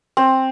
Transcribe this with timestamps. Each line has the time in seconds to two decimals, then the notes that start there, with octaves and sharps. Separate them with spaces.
0.17 C4